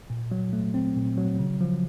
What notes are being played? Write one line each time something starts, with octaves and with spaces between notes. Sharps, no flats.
A#2
F#3
A3
C4
A#2
F#3
C#3
F3